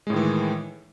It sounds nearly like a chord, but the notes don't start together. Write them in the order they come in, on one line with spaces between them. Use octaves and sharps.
G#3 A2 D#3 E3